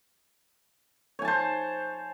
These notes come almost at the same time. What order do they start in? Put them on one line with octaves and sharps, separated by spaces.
C#5 G#5 A5 C5